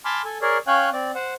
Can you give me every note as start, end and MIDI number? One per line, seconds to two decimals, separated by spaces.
0.05 0.22 80
0.05 0.22 81
0.05 0.22 83
0.05 0.22 84
0.05 0.22 86
0.05 0.22 89
0.25 0.38 69
0.25 0.38 80
0.42 0.58 68
0.42 0.58 70
0.42 0.58 73
0.42 0.58 74
0.67 0.90 61
0.67 0.90 73
0.67 0.90 77
0.67 0.90 79
0.67 0.90 80
0.67 0.90 90
0.93 1.11 60
0.93 1.11 74
1.15 1.34 72
1.15 1.34 78